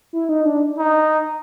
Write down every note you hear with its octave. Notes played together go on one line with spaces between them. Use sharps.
E4
D#4
D4
D#4